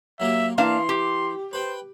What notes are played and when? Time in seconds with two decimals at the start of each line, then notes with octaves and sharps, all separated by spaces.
0.20 F#3 A#3 G4 E5
0.58 E3 A#3 D4 F5 C6
0.89 G4
1.53 B4 C5 G5